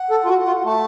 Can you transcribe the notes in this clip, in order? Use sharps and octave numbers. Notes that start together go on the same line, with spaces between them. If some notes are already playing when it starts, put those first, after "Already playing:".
Already playing: F#5
A4
F4
F#4
F4
A3 A5